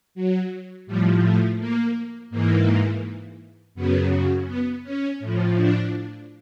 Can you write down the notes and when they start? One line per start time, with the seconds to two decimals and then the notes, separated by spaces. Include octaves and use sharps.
0.15 F#3
0.87 A2 F3 G3
1.23 A3
1.58 A#3
2.30 G#2 E3 A#3
3.75 F#2 C#3 F#3 B3
4.47 B3
4.83 C#4
5.20 A2 F3
5.56 D4